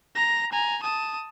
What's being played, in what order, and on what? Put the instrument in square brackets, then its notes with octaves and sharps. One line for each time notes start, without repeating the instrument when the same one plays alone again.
[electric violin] A#5 A#6
G#5 A#5
A5 D#6